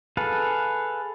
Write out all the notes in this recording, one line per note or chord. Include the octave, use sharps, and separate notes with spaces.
G#4 A4 B4 F5